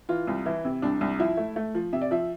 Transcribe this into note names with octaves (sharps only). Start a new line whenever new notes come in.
E3 F4
C2
E3 E4
C3
C2 D4
C2
F3 E4
A3
A3
F3
C3 E5
D5
F3 E5